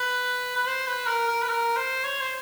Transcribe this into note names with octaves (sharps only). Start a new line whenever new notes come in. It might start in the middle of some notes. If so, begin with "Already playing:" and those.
Already playing: B4
B4
C5
B4
A#4
A#4
B4
A#4
C5
C#5
C5